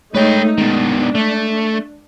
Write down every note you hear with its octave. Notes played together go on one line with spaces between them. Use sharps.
G#3 A3 D#4 B4 C#5 G5
B2 D#3 G#3 D4
A3